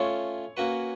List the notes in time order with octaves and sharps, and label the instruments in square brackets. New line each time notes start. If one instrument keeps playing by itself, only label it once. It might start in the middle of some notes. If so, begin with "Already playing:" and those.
Already playing: [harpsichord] A3 C#4 F4 [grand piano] C#5
[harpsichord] A#3 C#4 F#4 B4